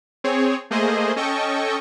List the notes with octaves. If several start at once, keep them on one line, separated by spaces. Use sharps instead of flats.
C4 G#4 C#5
A3 A#3 G#4 C5 D#5
C#4 A4 D#5 G5 C#6